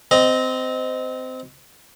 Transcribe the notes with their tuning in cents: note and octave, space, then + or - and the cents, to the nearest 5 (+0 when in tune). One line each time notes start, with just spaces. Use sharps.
C4 -20 D#5 +0